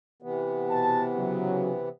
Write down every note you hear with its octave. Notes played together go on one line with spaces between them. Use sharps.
C3 E3 B3
B2 A5
C#3 F#3